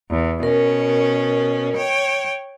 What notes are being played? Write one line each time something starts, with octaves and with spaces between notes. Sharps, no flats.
E2
B2 C#4 A#4
C#5 G5